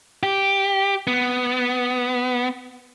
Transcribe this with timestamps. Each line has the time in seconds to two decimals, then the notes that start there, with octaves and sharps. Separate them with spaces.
0.23 G4
1.07 B3